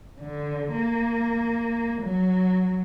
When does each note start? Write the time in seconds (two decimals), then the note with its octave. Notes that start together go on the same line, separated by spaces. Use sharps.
0.20 D3
0.72 A#3
2.01 F#3